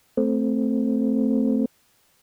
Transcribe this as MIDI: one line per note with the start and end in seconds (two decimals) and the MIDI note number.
0.17 1.65 57
0.17 1.65 60